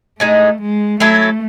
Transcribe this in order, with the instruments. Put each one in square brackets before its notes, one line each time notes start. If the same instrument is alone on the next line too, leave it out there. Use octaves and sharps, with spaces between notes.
[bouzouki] A2 G#3 D#4 [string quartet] A3
[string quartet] G#3
[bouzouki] F#3 C#4 E4 A4 [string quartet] A3